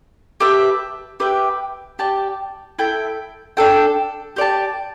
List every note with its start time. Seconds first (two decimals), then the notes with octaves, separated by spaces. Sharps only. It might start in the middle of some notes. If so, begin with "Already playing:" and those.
0.40 G4 B4 E5 A5
1.20 G4 B4 E5 G5
1.99 G4 D5 A5
2.78 E4 A4 E5 G5
3.57 D4 A4 G5
4.36 G4 D5 A5